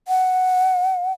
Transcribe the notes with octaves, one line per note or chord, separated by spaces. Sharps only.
F#5